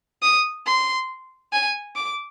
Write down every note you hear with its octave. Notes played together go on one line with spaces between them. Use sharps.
D#6
C6
G#5
D6